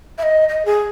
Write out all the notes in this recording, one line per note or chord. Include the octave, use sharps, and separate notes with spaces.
E5
D#5
D#5
G#4